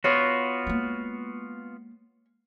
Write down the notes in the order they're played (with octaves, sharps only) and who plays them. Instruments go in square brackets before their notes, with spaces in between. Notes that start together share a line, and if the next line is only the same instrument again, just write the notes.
[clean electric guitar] B3 F4 F#4 [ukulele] C#5
[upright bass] G#3 A#3